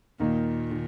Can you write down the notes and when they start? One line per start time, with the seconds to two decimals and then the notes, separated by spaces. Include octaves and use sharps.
0.20 D#2 A#2 D#3 A#3 D#4
0.71 D#3